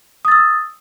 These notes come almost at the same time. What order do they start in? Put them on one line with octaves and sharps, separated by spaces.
D#6 A6 E6